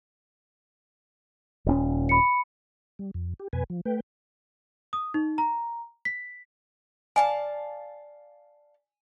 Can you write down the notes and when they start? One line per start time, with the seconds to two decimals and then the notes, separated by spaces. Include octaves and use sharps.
1.66 D#1 C4 C#4
2.09 B5 C#7
2.99 G3
3.14 F2
3.40 G4
3.53 F2 B2 B4 G#5
3.70 F3
3.85 A3 B4 G5
4.93 D#6
5.14 D#4
5.38 A#5
6.05 B6
7.16 D5 F5 G#5 A5